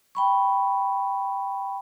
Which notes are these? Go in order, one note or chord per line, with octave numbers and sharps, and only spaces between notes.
G5 B5 C#6